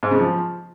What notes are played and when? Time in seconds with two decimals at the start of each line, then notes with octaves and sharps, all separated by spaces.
0.03 G#2
0.11 C#3
0.20 F3